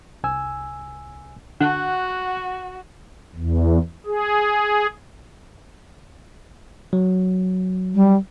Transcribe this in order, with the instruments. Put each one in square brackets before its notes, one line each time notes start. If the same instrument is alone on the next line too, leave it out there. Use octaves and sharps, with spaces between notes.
[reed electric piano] C2 G#5 E6
[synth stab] D3 [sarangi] F#4 [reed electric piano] F#5 F#6
[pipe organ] E2
G#4
[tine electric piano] F#3
[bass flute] G3